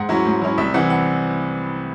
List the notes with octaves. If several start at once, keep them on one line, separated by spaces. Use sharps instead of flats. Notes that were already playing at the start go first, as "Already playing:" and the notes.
Already playing: G#2 F#5
F#3 C#4 E4
G#2
F#3 C#4 E4
C2 E5
C3 E3 F#5
F#5